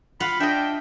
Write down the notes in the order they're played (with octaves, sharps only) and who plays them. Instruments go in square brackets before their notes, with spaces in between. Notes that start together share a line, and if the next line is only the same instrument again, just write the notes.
[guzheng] F4 F5 F#5 [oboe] B5
[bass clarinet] D4 [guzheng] D#5 E5 [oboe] G5